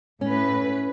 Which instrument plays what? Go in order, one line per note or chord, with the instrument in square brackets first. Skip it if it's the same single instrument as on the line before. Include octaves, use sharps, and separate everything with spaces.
[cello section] A2 B4 [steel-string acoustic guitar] C#4